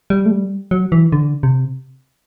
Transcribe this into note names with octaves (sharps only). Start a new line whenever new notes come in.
G3
A3
G3
F#3
E3
D3
C3